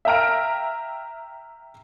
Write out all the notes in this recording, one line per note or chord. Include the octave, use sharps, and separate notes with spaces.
E5 F5 G5 A#5 F6 D7